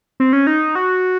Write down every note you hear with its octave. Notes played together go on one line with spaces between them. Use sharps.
C4
C#4
D#4
F#4